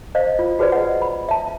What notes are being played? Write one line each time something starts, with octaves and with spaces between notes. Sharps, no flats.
C5 D#5 F5
F4
F#4 G#4 B4 C5 D5
D#5 F#5
B5
E5 A5